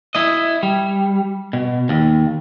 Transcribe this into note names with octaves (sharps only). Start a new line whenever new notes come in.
E4 D#5
G3
B2
D#2